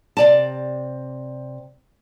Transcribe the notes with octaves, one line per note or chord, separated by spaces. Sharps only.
C3 D5 A5